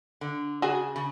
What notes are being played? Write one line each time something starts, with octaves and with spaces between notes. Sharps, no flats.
D3
C#3 F#4 G#4
C#3